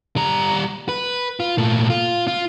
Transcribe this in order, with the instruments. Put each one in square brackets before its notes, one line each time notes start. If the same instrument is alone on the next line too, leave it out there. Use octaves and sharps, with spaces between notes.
[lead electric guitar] G3 A#5
B4
F4
A#2 A3
F4
F4